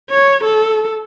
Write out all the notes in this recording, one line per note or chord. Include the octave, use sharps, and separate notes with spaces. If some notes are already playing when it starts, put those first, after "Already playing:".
C#5
A4